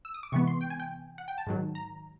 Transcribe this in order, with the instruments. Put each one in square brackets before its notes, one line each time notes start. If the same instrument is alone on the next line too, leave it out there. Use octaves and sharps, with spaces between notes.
[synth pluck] E6
D#6
D6
C3 E3 G#3 B3 C#6
C6
G5
G#5
G5
F#5
G5
A5
G#2 D#3 F#3
A#5